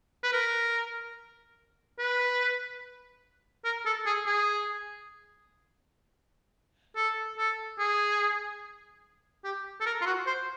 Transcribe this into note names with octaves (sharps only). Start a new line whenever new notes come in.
B4
A#4
B4
A#4
A4
G#4
G#4
A4
A4
G#4
G4
A4
A#4
F4
F#4
C5